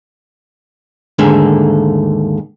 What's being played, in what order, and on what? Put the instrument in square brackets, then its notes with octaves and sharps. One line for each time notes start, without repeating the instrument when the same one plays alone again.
[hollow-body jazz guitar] D#2 G#2 D3 D#3 A3 A#3